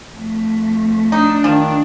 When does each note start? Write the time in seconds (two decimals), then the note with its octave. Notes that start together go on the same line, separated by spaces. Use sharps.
0.12 F2 A3
1.12 D4 D#4
1.44 D#3 F3